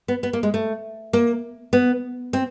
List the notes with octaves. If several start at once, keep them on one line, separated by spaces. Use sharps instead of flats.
B3
B3
A#3
G#3
A3
A#3
B3
C4